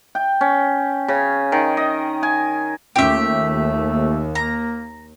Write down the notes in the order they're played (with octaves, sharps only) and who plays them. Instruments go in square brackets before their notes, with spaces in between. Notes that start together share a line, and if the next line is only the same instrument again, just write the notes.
[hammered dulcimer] G5
C#4
C#3
D#3
D#5
G#5
[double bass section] D#2 [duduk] A3 [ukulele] C#4 F4 G5 [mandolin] G4 E5
[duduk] A#3 [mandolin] A#5